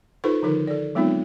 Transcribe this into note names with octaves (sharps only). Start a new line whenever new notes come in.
D#4 F4 A4 B4 C5 C#6
D3 D#3 F3 D#4 A#4
A4 D5
F#3 G#3 B3 C4 D#4 F4